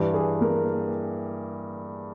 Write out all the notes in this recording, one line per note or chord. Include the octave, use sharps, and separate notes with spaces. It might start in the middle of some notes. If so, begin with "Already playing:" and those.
Already playing: G2 E3 G4
G#4
A#3 A#4